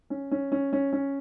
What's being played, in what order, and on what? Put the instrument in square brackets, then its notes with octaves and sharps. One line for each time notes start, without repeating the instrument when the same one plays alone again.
[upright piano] C#4
C#4
C#4
C#4
C#4